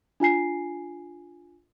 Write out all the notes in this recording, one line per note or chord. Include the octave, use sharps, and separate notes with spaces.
D4 F4 G#5 C7